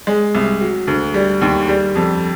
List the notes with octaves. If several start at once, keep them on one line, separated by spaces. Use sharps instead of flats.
G#3
C2
F#3
D2
G3
D#2
G3
F2